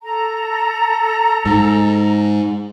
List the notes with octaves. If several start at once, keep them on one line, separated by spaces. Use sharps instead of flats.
A4 A#5
G#2